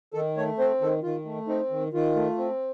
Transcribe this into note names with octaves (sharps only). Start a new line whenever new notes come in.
D#3 A4
A3 C#5
C4 C5
D#3 A4
D#3 F4
A3
C4 D#4
D#3
D#3 F4
A3
C4